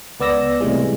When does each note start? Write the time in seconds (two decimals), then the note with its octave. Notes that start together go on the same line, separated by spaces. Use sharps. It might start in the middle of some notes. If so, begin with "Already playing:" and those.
0.20 C#2 B3 D5 E6 A#6
0.60 A2 C3 E3 G3 G#3